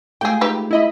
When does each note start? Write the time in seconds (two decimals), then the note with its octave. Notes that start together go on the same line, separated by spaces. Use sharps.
0.21 G#3 A3 F4 G4 G#4 G5
0.41 D#4 G4 B4
0.71 E4 D#5 B5